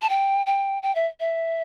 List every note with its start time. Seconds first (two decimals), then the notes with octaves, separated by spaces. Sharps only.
0.02 A5
0.09 G5
0.46 G5
0.83 G5
0.95 E5
1.20 E5